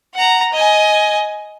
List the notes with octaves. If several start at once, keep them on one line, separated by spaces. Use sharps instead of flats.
F#5 A#5
D#5 G#5